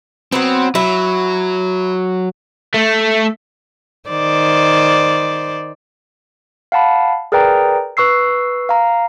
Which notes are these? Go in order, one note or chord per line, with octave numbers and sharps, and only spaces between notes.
F#3 B3 C4
F#3 E4
A3
D#3 C5 D5
F5 F#5 A5 B5
G#4 A#4 B4 D5 G5 A#5
B4 C#6 E6 C7
F5 A#5